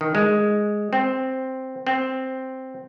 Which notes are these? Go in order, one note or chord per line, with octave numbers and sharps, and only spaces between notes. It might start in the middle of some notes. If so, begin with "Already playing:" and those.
D#3
G#3
C4
C4